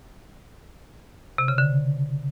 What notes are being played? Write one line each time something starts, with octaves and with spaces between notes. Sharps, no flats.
C3
C#3
D3